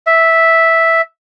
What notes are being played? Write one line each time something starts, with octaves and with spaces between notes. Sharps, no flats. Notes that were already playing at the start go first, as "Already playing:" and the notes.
E5